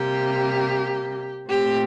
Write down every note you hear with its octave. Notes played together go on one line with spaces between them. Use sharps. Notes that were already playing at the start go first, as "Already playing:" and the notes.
Already playing: C3 G3 A#3 G4
A#2 A3 C4 G4